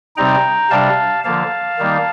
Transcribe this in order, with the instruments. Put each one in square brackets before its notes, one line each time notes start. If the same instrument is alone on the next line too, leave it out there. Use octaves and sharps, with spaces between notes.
[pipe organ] C3 G3 C4 D#4 G5 A#5
C3 G3 D4 F5 A5
D3 F3 A#3 F5 A5
D#3 G3 A#3 D#4